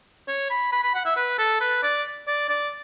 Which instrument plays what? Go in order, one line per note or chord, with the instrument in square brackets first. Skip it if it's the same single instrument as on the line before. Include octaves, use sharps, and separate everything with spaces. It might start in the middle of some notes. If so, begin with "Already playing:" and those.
[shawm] C#5
B5
B5
B5
F#5
E5
B4
A4
B4
D5
D5
D5